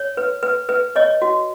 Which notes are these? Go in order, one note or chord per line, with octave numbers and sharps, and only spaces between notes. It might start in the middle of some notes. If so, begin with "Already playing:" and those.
Already playing: C#5
B4
B4
B4
C#5 D#5
F#4